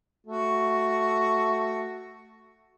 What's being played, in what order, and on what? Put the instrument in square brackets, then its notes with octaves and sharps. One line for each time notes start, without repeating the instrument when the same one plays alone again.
[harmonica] A3 F#4